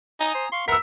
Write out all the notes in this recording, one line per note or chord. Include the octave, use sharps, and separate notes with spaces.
D#4 G#5 A#5 D#6
C5
F5 C6 C#6
A#4 B4 E5 F#5 E6 B6